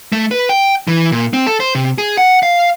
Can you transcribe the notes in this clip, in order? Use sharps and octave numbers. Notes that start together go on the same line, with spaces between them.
A3
B4
G5
E3
A#2
C4
A4
C5
C3
G#4
F#5
F5